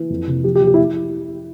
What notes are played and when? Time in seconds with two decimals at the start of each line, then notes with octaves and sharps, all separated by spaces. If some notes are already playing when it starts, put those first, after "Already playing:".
Already playing: E3
0.10 F2
0.27 C3
0.44 F3 G4
0.55 G4
0.61 F3
0.67 G4
0.74 E4